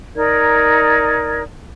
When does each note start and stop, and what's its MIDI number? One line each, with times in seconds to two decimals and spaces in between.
0.15 1.42 63
0.15 1.42 70
0.15 1.42 74
0.15 1.42 92